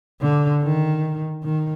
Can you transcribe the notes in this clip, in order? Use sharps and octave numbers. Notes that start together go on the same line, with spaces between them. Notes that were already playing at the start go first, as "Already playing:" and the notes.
D3
D#3
D#3